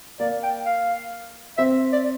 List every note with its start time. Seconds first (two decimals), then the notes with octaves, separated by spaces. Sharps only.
0.20 A#3 D5
0.43 G5
0.66 F5
1.58 C4 E5
1.92 D5